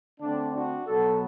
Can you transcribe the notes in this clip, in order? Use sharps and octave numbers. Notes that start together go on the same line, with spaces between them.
D3 A3 C4 D4
D4 F#4
B2 F#3 B3 F#4 A4